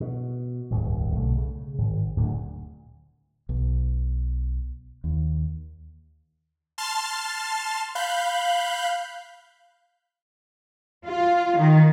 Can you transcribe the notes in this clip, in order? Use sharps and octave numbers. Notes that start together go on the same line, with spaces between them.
B2
D#1 G#1 C#2
B1 D3 A3
C#3
G#1
D1 D2 A#2
B1
D#2
A5 C6 F6 A6
F5 B5 F#6 G6
F4
D#3